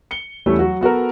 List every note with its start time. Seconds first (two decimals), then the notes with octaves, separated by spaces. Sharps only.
0.11 C#7 G7
0.46 E2 G3 A3 C#4 E4
0.59 F#3 F#4
0.81 B3 F#4 A4 A#4